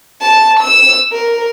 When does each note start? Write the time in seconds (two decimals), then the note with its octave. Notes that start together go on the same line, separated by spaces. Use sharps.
0.21 A5
0.60 E6
1.12 A#4